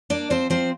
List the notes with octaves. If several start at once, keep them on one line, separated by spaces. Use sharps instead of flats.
A#3 D4 D5
F3 C4 C5
F3 C4 C5